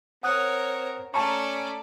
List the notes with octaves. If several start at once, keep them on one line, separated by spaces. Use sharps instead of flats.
C4 A#4 C#5 F#5 D#6 F#6
A3 C#4 D5 A5 A#5 C#6